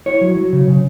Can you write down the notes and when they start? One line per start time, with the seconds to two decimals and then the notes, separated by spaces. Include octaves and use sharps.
0.06 E4 C#5
0.21 F#3
0.37 F#3
0.53 C#3
0.68 C#3